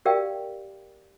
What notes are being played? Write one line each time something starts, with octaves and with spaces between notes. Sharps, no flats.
G4 A#4 D5 E5 F5 G5